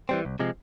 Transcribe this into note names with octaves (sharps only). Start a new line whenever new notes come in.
E3 G3 C4
C2
C3 F3 G#3